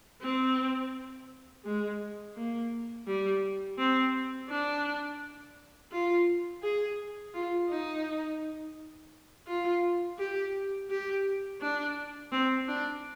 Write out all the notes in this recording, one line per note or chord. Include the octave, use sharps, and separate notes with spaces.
C4
G#3
A#3
G3
C4
D4
F4
G#4
F4
D#4
F4
G4
G4
D4
C4
D4